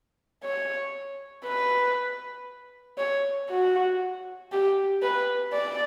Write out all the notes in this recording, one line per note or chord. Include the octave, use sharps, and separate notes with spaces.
C#5
B4
C#5
F#4
G4
B4
D5